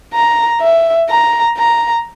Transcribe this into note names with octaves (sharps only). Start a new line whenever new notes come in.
A#5
E5
A#5
A#5